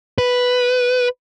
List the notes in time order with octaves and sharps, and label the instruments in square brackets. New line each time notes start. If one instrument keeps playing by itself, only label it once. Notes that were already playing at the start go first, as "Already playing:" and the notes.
[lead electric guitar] B4